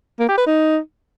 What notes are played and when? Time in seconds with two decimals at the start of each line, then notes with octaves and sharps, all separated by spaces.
0.20 A#3
0.29 G4
0.38 B4
0.47 D#4